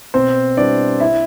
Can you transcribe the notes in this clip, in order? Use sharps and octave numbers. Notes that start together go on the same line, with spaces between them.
B2 C4 C5
G3 B3 D4 E4 D5
E4 E5